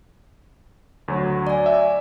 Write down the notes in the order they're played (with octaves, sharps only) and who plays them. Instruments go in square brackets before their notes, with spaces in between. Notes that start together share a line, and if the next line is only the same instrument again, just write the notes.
[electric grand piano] D2 F#3
[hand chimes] D5 G#5
[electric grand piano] E5